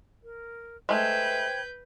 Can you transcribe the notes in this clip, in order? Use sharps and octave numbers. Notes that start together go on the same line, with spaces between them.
A#4
G#3 A3 B4 C5 G5 G6 G#6